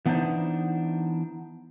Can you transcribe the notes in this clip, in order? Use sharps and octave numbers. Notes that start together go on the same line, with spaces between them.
E3 B3 D4 D#4 C5